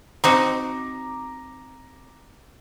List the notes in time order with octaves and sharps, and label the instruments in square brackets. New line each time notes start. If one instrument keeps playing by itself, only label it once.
[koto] C4 D#4 F#4 [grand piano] A#5 D6